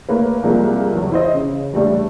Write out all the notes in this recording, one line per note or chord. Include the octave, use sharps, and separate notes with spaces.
A3 A#3 B4
C2 F3 G#3 A#3
B1 E2
E4 C5 D#5
C#3
E2 G3 A3 D4